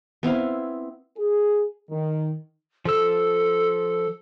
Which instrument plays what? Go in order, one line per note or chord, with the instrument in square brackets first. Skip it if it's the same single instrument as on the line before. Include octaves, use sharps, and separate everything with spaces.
[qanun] B3 C4 E4 F5
[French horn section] G#4
D#3
[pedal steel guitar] F3 E6 [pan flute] A4